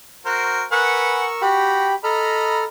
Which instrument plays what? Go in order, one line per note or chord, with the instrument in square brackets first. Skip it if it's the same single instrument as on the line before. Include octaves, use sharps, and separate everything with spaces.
[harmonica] F#4 A#4 C5
[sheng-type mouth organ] A#4 C#6 E6 [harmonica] B4 F#5 G#5
[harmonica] F#4 [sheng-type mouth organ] G4 G5 B5
[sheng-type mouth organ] A4 F6 [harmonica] D#5 A#5 B5